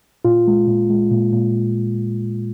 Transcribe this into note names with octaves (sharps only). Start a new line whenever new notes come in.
A#2 F4
G#3
A#2
G#3
A#2
A#2